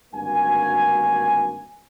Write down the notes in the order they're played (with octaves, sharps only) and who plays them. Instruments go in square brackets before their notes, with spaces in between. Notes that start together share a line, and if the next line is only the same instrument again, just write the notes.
[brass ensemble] G#1 D2 G2 A#3 F#4 G#5